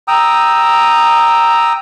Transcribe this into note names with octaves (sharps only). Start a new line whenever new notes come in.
G5 A#5 D#6 E6